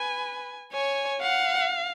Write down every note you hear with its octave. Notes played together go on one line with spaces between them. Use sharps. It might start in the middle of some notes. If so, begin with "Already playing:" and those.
Already playing: B4 G#5
C#5 G#5
F5 F#5